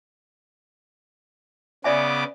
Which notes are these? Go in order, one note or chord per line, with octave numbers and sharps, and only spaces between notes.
C#3 B3 D5 E5 G#5 D6